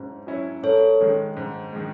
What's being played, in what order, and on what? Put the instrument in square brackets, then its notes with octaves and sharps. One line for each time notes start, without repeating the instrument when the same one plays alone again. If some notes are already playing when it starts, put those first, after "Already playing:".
Already playing: [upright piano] G#2 F#3 C#4 E4
F#3 C#4 E4
[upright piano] G#2 [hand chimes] A4 C#5
[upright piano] D#3 G#3
G#2
D#3 G#3